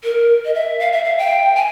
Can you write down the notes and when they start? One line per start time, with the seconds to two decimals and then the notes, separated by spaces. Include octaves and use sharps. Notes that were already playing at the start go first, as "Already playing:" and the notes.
0.04 A#4
0.45 D#5
0.54 E5
0.80 F5
0.92 E5
1.04 F5
1.18 G5
1.56 G#5